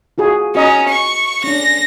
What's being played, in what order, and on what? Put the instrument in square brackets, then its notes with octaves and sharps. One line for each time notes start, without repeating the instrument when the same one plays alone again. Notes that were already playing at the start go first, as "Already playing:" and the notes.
[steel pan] F4 F#4 G#4
[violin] C#4 [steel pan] F#4 D#5 A#5
[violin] C#6
[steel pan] C#4 D4 [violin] A#6